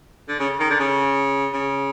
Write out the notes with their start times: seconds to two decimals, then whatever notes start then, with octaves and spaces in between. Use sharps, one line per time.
0.29 D3
0.39 C#3
0.60 D#3
0.70 D3
0.80 C#3
1.53 C#3